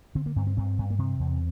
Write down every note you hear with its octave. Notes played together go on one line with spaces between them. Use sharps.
D3 C4
A#3
G2 C4
C4
G2 C4
G2
A#3
C3 C4
E2